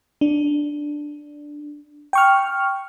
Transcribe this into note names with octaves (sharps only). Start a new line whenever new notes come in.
D4
G5 C#6 F6